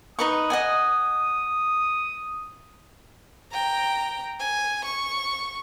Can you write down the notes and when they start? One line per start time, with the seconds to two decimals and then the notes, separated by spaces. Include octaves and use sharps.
0.19 D#4 B4 C#6 D#6
0.50 D#5 F#5 G#5
3.53 G5 A#5
4.40 G#5
4.85 C#6